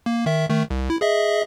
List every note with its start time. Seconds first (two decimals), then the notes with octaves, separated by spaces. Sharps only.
0.06 A#3
0.26 D#3 E5
0.49 D#3 A3
0.70 C2
0.90 E4
1.01 G#4 D#5 E5